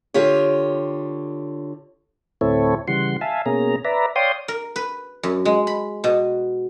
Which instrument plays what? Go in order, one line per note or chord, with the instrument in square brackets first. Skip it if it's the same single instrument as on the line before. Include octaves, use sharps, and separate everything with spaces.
[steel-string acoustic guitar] D3 F4 G4 C#5
[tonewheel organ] D2 A2 C4 E4 A4 C#5
C#3 E3 G3 F#5 C6
E5 F5 G#5 A5
B2 A#3 C#4 G#4 A#5
B4 D5 E5 A#5
C#5 D5 F5 G5 C6 D#6
[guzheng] A#4
B4
F#2
G#3
B5
B2